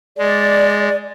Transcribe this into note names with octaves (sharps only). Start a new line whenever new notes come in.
G#3 D5